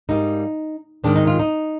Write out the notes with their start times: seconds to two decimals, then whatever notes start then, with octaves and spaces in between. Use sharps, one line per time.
0.09 G#2 G3 A#3 D#4
1.04 G#2 D#3 G#3 C4 D4
1.16 D#4
1.27 F4
1.39 D#4